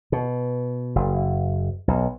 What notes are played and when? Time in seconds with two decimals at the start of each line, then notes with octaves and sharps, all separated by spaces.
0.12 B2
0.96 F#1
1.88 B1